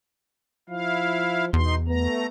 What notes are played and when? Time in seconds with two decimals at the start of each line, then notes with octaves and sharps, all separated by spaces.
0.69 F3 E4 F5
1.53 E2 B2 D#4 C6
1.88 A3 B3 A#5